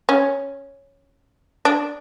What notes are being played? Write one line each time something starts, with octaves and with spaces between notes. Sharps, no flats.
C#4
D4